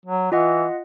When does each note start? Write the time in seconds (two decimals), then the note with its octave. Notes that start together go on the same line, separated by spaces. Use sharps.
0.06 F#3
0.32 E3 F4 D#5 F#5